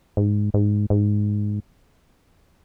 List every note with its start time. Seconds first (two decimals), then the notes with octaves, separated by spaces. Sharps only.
0.17 G#2
0.54 G#2
0.90 G#2